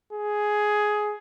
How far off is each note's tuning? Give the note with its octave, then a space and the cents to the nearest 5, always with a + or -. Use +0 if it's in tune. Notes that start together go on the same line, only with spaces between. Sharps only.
G#4 +10